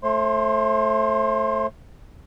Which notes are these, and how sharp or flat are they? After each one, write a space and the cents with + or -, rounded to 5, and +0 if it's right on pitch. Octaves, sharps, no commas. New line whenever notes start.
A3 +0 C5 +40 C6 +0